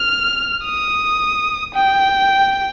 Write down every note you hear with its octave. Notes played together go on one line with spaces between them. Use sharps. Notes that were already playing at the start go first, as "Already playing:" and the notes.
Already playing: F6
D#6
G5